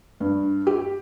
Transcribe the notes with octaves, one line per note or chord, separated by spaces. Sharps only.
G2
G4